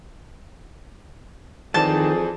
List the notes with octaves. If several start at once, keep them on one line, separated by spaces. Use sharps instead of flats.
F2 D#3 E3 G#4 C5 D5 A5